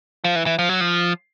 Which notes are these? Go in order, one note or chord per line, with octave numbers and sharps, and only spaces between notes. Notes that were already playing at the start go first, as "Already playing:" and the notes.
F3
E3
E3
F3
F#3
F3